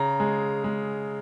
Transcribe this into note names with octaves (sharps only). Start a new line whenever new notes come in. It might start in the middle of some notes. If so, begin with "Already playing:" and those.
Already playing: C#3 A#5
G#3
G#3